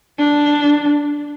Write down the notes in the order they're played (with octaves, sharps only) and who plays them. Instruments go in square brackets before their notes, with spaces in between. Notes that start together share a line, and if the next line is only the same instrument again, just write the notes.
[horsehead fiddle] D4